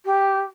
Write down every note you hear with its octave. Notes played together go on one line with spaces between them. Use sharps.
G4